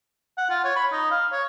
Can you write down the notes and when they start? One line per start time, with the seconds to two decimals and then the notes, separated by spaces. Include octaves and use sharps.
0.38 F#5
0.50 F4
0.65 C#5
0.76 B5
0.92 D#4
1.11 F5
1.32 C#5